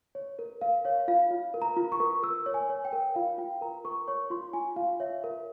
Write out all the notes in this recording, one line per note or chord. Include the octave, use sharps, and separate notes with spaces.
C#5
A#4
A#4 F5
C#5 F5
F4 F5
F4
A#4
A#5
F4
C#6
A#4
A#4 E6
C#5
G#5
C#5
G5
A#4
F4 F5
F4 G5
A#4 A#5
A#4 C#6
C#5 C#6
F4 C6
F4 G#5
F4 F5
C#5 E5
A#4